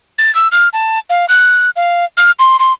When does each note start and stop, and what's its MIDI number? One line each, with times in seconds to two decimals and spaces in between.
0.18 0.34 93
0.35 0.48 88
0.52 0.69 89
0.73 0.99 81
1.10 1.26 77
1.29 1.70 90
1.76 2.05 77
2.17 2.31 89
2.39 2.57 84
2.59 2.73 84